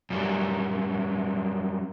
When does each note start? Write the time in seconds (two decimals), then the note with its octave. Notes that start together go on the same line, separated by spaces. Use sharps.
0.10 F#2 G3